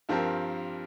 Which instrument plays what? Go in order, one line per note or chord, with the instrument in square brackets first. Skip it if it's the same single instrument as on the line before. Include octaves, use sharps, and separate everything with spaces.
[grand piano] G2 F3 C4 G4 A#4